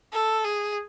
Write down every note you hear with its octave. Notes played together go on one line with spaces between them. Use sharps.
A4
G#4